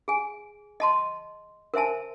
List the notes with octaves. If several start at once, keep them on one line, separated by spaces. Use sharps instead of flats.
G#4 G#5
D#5 A5 C6
A#4 C5 E5 G#5 A5